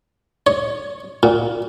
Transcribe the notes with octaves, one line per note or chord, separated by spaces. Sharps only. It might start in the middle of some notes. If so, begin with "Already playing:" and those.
C#5
A#2